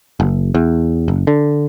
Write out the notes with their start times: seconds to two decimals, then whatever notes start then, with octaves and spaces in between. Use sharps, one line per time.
0.20 F#1
0.55 E2
1.08 F#1
1.27 D3